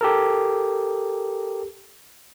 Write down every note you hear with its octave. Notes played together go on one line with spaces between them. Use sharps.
G4 A4 A#4